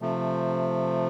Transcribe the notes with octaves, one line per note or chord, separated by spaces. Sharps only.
C3 F3 A3